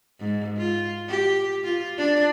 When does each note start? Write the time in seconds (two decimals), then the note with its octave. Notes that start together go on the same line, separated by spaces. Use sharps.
0.20 G#2
0.57 F4
1.08 G4
1.64 F4
1.98 D4